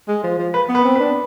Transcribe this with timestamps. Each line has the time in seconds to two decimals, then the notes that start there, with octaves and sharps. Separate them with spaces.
0.08 G#3
0.24 F3
0.38 F3
0.54 B4
0.69 B3
0.75 B4
0.85 C4
0.95 B4
1.00 D4